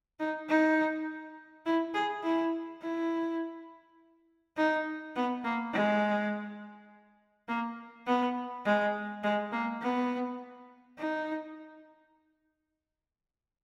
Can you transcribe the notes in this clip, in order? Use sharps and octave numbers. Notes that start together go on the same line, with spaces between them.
D#4
D#4
E4
G#4
E4
E4
D#4
B3
A#3
G#3
A#3
B3
G#3
G#3
A#3
B3
D#4